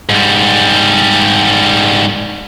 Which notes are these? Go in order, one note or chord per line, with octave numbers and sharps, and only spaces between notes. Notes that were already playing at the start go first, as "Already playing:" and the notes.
G#2 G3